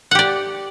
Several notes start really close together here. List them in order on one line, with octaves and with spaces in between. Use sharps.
F#5 G4 D5